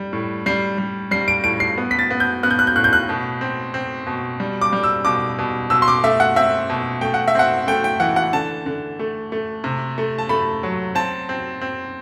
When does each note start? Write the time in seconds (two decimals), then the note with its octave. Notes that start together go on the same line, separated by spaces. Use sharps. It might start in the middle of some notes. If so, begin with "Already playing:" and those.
Already playing: G3
0.13 A2
0.46 G3 C7
0.78 G3
1.11 G3 C7
1.28 D7
1.44 A2 D7
1.60 C7
1.78 B3
1.91 B6
1.99 A6
2.11 B3
2.20 G6
2.43 B3 F#6
2.50 G6
2.59 F#6
2.67 G6
2.76 A2 F#6
2.84 G6
2.93 F#6
3.09 B2
3.41 C4
3.74 C4
4.07 B2
4.40 G3
4.61 D6
4.73 G3
4.83 E6
5.05 B2 D6
5.38 B2
5.70 B2 E6
5.82 C6
5.88 D6
6.04 A3 E5
6.20 F#5
6.36 C4 E5
6.70 B2
7.01 A3 G5
7.14 F#5
7.28 E5
7.35 C4 F#5
7.67 A3 G5
7.84 G5
8.00 E3 F#5
8.16 F#5
8.33 D3 A5
8.66 D3
8.99 A3
9.32 A3
9.64 C3
9.98 A3
10.18 A5
10.29 A3 B5
10.63 F#3
10.95 C4 A5
11.29 C4
11.61 C4